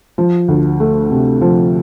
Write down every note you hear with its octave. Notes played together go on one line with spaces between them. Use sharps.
F3
D2
A3
C3
F3